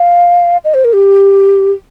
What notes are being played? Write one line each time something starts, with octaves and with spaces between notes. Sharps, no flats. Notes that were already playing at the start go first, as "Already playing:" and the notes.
Already playing: F5
D#5
C5
A#4
G4